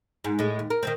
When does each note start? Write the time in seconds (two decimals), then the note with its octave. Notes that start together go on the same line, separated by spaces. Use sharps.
0.24 G#2
0.39 A2 G#3
0.59 D#2
0.70 A#4
0.83 D#3 F#3 C4